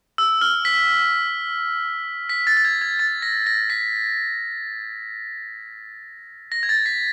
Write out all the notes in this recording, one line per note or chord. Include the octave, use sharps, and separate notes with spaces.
E6
F6
B6
B6
A6
A6
G#6
G#6
A6
A#6
A#6
B6
A#6
G#6
A6
B6